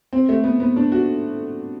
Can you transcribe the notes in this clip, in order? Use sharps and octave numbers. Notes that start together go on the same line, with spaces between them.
C4
A3
B3
B3
D4
F#4